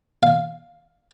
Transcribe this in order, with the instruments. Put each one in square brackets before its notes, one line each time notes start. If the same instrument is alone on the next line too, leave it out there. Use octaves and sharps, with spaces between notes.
[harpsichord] F5